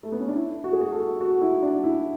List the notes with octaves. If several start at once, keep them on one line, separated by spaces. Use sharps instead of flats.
A3
B3
C#4
D4
E4
F#4
G#4
F#4
A4
F#4
E4
D4
E4